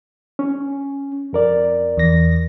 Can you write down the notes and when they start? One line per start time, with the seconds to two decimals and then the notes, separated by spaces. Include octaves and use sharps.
0.39 C#4
1.33 F2 A#4 D5
1.97 E2 A#6